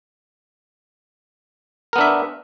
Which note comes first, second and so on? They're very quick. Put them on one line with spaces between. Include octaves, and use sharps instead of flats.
A#4 B3 D4 E5